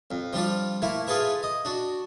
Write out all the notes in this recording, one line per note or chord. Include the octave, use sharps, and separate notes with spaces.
F2
F3 G3 D4 F4
A3 A#3 E4
F4 G#4 A4 B4 E5
D#5
D4 F#4